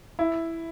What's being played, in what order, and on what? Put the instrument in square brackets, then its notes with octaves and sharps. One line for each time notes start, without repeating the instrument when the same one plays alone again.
[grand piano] E4